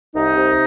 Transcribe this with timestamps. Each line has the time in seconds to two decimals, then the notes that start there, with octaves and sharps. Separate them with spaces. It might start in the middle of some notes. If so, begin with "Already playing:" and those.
0.15 C2 D#4
0.36 C3